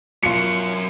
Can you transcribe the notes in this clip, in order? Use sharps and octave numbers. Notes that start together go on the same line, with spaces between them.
B2 F#3 F4 A#4 C#7